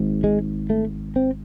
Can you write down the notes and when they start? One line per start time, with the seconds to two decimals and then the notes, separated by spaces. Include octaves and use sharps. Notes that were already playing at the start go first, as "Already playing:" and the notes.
Already playing: G#1 G#2
0.24 G#3
0.70 A3
1.16 C4